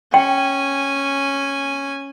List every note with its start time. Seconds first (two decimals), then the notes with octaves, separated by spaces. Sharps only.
0.14 C#4 G5 G#5